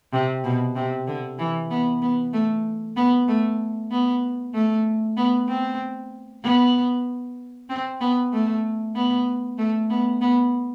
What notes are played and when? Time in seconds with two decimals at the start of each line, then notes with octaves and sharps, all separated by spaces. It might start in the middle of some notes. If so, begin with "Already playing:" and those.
0.13 C3
0.44 B2
0.76 C3
1.07 D3
1.39 E3
1.70 B3
2.02 B3
2.33 A3
2.97 B3
3.28 A3
3.91 B3
4.54 A3
5.17 B3
5.48 C4
6.43 B3
7.69 C4
8.01 B3
8.33 A3
8.95 B3
9.58 A3
9.90 B3
10.21 B3